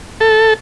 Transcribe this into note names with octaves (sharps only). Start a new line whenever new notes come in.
A4